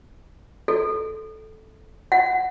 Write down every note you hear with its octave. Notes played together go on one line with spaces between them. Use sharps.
A4
F#5